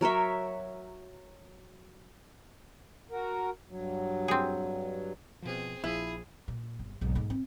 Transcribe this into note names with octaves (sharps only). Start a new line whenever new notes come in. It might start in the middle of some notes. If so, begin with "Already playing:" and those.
F#3 A#4 C#5 E5
F#4 A#4
G2 F#3
C4 G#4
B2 F3 C4 G#4
A#1 F3 E4 G#4
A#2
G1
B1 G#2
G#2 A3
C4